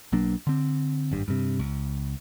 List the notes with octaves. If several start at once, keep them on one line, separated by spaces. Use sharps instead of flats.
B1 F#3 A#3 D4
D3 C4
G#1 G2 G3
G2 C3
C#2